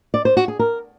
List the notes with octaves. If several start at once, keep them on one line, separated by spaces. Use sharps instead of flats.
D5
C5
F#4
G#4
A#4